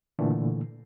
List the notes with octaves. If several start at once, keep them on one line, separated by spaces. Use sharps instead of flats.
A#2 D3 E3 A3